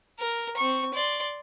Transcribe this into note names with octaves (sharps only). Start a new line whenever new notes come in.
A#4
C4 C#6
D5 C6